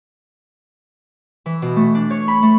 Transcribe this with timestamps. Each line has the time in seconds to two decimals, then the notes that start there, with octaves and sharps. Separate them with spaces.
1.46 E3
1.62 B2
1.76 A3
1.95 D4
2.10 C#5
2.28 B5
2.42 A3